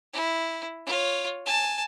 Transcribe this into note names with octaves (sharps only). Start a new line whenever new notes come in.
E4
F4 C#5
G#5 A5